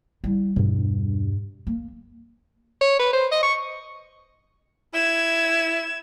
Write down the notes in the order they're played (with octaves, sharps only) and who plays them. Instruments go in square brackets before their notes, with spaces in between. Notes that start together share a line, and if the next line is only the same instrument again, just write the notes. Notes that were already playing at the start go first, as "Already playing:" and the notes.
[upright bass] G3 E4
[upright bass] E2 B2 [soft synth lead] G2
[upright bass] A#3
[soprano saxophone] C#5
B4
C5
D#5
C#6
[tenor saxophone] E4 [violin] G#6 E7